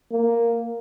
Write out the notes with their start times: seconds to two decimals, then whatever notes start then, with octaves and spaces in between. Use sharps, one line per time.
0.12 A#3